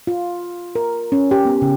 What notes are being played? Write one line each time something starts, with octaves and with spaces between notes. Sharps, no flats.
F4
A#4
C#4
G4
B3
C#3